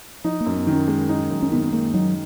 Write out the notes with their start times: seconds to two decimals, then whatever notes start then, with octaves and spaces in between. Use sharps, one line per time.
0.24 F3 D#4
0.41 A#3
0.46 F#2
0.56 B3
0.67 D#3
0.72 C#4
0.88 G#3
1.09 D#4
1.30 F#2
1.43 C#4
1.52 D#3 B3
1.64 B3
1.73 G#3 A#3
1.94 F#3 D#4